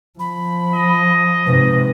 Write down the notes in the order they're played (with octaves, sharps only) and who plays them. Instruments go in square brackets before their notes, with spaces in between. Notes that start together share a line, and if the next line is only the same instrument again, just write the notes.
[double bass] F3 [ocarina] B5
[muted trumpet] D#5
[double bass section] G#2 C3 [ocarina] B4